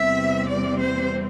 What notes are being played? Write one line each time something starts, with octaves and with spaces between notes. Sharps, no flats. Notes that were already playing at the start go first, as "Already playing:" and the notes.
Already playing: E2 C3 G3 C4 E5
D5
C5